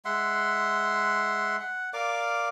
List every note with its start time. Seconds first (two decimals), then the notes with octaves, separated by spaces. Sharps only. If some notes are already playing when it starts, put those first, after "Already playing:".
0.05 G#3 E5 F#5 C6
1.60 F#5
1.93 A#4 D5 F5 D6